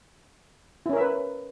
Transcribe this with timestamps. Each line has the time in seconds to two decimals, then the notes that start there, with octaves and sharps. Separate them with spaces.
0.86 E4
0.89 C#4
0.93 A#4
0.97 E5
1.00 B4